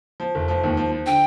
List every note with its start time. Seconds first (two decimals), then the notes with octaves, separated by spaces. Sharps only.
0.20 F3
0.35 F1
0.48 F3
0.64 D#2
0.77 F3
0.92 F3
1.06 D3 G5